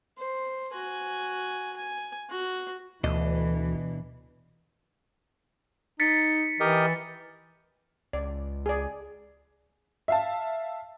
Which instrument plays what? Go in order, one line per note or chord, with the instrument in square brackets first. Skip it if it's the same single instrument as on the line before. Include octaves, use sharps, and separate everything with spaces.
[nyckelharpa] C5
F#4 G#5
G#5
F#4
[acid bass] D2 [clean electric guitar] B2 D4 D#5 [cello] E3
[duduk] D#4 [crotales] A6 B6 C#7
[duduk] E3 [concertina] G4 A#4 D#5
[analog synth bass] C#2 [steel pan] D5
[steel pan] G#4 D5
[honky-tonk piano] E5 F5 A5